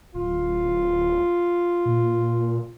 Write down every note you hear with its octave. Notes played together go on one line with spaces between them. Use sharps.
D1 F4
A#2